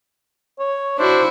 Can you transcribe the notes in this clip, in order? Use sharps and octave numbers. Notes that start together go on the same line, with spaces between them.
C#5
D4 E4 F#4 C5